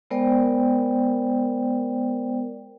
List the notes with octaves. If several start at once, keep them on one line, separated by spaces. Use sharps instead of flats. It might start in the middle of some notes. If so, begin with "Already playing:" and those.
G#3 B3 A#4 C5 D5 G5